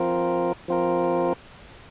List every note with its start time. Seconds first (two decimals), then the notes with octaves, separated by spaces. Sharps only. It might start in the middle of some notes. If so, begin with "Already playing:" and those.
Already playing: F3 C4 F4 A#4
0.68 F3 C4 F4 A#4